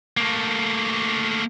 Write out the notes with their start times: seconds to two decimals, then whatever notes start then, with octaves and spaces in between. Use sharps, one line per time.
0.17 A3 A#3